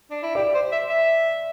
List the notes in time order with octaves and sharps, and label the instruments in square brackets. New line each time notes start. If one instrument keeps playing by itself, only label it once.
[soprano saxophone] D4
E4
[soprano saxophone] G4 [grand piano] D5
[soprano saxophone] C5
E5
E5